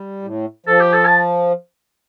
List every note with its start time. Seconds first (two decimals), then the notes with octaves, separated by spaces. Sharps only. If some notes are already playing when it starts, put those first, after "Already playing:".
Already playing: G3
0.22 A2
0.66 F3 A4
0.80 G4
0.93 A4
1.06 A5